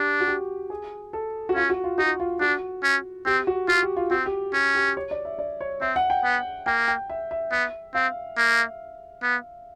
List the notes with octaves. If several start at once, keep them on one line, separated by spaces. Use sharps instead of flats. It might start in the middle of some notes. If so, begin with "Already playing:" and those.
Already playing: D4 G4
F#4
G4
G#4
A4
F#4
C#4 F4
F#4
F4
D#4 F#4
F4
D4 F#4
C#4
C4 G4
F#4
F4 F#4
G4
F4
C4 F#4
G4
C#4 G4
G4
C#5
D5
E5
D5
C#5
C4 E5
F#5
G5
B3
A#3 G5
G5
E5
E5
B3 E5
C4 F5
A#3
B3